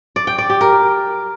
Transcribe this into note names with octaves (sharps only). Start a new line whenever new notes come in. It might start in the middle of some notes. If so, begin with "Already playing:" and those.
D5
G5
D5
G4
A#4